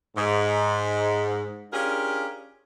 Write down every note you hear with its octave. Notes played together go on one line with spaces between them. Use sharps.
G#2
C#4 D4 F4 G4 G#4 A#4